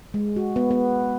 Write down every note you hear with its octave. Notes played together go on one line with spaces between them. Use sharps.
G#3
F#4
B3
B3